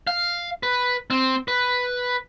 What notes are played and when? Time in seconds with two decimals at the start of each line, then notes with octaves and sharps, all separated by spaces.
0.07 F5
0.63 B4
1.10 C4
1.48 B4